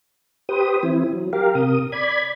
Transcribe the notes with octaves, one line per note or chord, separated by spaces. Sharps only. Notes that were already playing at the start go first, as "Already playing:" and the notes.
G4 B4 C5 D#6
E3 C4 E4
F#3
G4 A#4 F5
C3 A#4 D#6
D5 B5 G#6